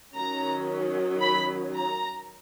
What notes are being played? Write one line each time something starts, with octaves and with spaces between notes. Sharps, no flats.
D#3 F#3 C#4 A#5
B5
A#5